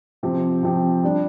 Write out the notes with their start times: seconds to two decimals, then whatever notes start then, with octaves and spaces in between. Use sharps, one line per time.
0.23 C3 F3 C4 G4
0.63 C3 F3 C4 G4
1.04 G3 D4 G4